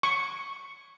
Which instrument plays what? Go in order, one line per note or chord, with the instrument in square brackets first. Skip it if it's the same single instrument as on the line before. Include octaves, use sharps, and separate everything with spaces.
[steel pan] C#6